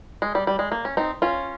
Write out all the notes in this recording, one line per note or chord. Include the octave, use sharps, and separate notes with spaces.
G#3
G3
G3
G#3
A#3
C#4
C4 D#4
C#4 F4